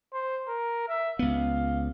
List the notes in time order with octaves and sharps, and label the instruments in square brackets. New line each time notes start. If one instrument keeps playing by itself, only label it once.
[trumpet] C5
A#4
E5
[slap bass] C#2 B3 [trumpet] F5